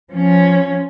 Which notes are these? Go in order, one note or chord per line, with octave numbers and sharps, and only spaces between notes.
F3 C#4